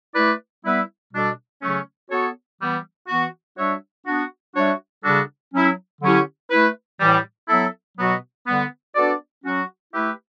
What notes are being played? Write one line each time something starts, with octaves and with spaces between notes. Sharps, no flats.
A3 E4 B4 D5
G3 B3 E4 B4 E5
B2 G3 D4 A4
C#3 F#3 A3 C#4
B3 F#4 A4 C#5
E3 G3 B3
E3 B3 F#4
G3 D4 F#4 C#5 E5
B3 D4 F#4
G3 D4 F#4 C#5 E5
C#3 G3 D4 F#4 A4
F#3 C#4 E4
D3 F#3 C#4 E4 G4
A3 E4 B4
A2 E3 G3
F#3 B3 E4 A4 E5
B2 F#3 B3 F#4
D3 G3 B3
B3 D4 F#4 A4 D5
F#3 C#4 F#4
A3 E4 G4 B4 E5